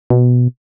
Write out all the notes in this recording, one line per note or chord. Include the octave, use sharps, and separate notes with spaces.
B2